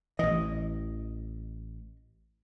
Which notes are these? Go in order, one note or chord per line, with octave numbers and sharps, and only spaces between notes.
A1 E3 D#5